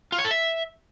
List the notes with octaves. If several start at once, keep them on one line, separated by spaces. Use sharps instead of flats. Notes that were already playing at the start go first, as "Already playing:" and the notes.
F4
C#5
A4
E5